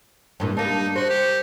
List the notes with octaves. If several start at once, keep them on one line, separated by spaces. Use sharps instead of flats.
G2 A#2 E3
G3 A#3 D4 D#4
F#4 C5
G4